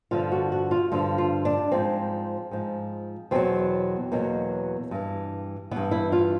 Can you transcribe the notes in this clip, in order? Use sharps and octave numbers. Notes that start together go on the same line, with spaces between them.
G2 D3 F3 F4
F#4
F#4
F4
G2 D3 F3 F4
F4
D4
G#2 F3 C4
G#2 F3
E2 B2 F#3 C4
E2 B2 F#3 A#3
G2 E3
G2 E3 B3
E4
F4